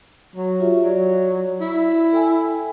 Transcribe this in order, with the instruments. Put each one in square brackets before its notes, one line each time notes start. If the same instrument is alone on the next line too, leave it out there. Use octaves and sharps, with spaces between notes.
[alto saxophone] F#3
[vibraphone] F4 G4 E5
[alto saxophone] F#3 [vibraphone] D5
[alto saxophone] E4
[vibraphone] A4 G5 G#5